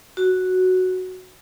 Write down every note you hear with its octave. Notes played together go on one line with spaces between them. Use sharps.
F#4